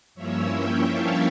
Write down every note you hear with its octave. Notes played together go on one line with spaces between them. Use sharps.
G2 F3 A#3 C#4 E4 C#5 E5
E5 G5
F5 A5